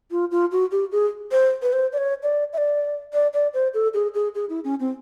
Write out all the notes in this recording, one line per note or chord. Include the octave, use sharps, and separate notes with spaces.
F4
F4
F#4
G4
G#4
C5
B4
C5
D5
C#5
D5
E5
D5
D5
D5
C5
A4
G#4
G#4
G#4
E4
C#4
C4